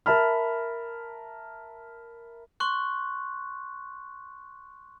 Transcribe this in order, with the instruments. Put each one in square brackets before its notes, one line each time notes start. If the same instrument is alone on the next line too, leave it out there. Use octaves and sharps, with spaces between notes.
[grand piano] A#4 E5 A5 B5 F6
[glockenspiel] C6 C#6 F#6